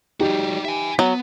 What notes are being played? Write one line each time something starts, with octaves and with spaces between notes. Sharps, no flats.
G3 D#4 F#4 G4
E5 G#5
F#3 B3